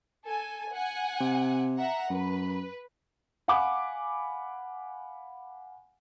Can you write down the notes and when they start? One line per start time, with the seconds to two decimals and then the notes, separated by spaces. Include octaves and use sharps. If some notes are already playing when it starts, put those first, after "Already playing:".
0.25 A4 G#5
0.74 F#5 G#5
1.20 C3
1.78 E5 F#5 A#5
2.10 F#2 B4
3.48 F5 F#5 G#5 B5 D6